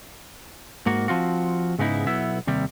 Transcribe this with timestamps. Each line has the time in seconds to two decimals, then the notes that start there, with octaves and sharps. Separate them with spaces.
0.86 G#2 A#3 F#4
1.08 F3 C4 F4 F#4
1.79 G#2 C#3 B3 D#4 E4
2.07 B1 B3 E4 E5
2.47 D#2 C3 G3